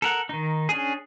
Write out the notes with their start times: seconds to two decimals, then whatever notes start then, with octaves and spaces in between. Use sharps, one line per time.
0.02 A4 A#4 F#5
0.29 D#3 D#4
0.69 C#4 D4 G#4